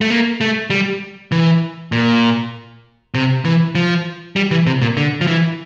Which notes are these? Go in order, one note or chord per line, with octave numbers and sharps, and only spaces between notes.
A3
A#3
A3
G3
E3
A#2
C3
E3
F3
G3
E3
C3
A#2
D3
F3
E3